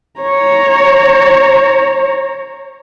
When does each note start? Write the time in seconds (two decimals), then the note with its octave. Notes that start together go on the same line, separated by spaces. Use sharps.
0.20 C#5 A#5